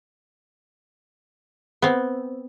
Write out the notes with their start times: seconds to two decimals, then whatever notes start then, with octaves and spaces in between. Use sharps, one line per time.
1.82 B3 C4